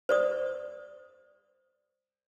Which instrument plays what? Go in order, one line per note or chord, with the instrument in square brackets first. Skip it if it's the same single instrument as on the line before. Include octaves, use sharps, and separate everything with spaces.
[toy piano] C5 D5 D#6